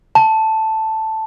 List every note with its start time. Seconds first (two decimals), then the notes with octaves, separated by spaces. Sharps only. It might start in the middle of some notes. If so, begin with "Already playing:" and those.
0.15 A5